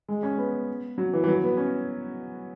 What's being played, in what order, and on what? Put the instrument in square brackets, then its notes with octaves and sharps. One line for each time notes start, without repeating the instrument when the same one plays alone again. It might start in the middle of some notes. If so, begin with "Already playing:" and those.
[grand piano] G#3
C#4
B3
F#3
E3
E3
F#3
B3
C#4